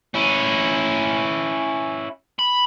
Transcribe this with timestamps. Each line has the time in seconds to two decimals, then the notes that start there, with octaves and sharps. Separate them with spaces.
0.14 C#4 E4
2.39 B5